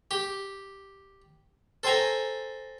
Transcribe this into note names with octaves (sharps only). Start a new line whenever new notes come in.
G4
A4 C5 G5 G#5 A#5